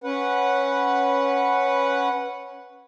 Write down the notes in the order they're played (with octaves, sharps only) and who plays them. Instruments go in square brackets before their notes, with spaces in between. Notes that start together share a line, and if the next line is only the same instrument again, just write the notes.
[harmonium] C#4 B4 F#5